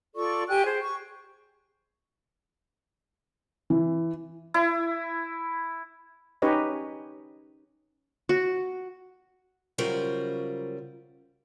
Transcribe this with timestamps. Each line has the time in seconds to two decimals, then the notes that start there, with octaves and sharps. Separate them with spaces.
0.16 F4 A4 D5 C#6
0.49 G4 G5 G#5 F#6
0.65 G#4 C5
0.81 C#6
3.70 E3
4.54 E4
6.42 C#4 D#4 G4 B4 C#5 D#5
8.29 F#4
9.78 C#3 F#3 G3 F4 A#4 C5